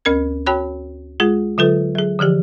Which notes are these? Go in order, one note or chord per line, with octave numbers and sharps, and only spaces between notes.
D2 C#4 A#4 G#6
F#4 C#5 G5 A5 B5 F#6
G#3 F4 G#4
D3 F#3 F4 A4 B4
F#3 G#4
D3 E3 F3 G4